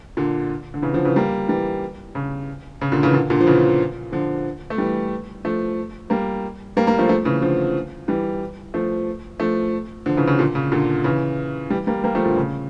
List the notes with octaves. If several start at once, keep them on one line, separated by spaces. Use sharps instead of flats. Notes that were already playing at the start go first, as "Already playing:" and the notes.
A#2 D3
D3
C#3 E3
D3 F3
C#3 E3
G3 A#3
E3 G3
C#3
C#3
A#2 D3
C#3 E3
A#2 D3
A#2 D3
F3
C#3 E3
D3 F3
A3
E3 G3
F3 A3
G3 A#3
G3 A#3
G3 A#3
F3 A3
F3 A3
C#3 E3
D3 F3
E3 G3
F3 A3
F3 A3
D3 F3
C#3 E3
C#3
A#2 D3
C#3
A#2 D3
C#3 E3
E3 G3
G3 A#3
G3 A#3
F3 A3
A#2 D3
C#3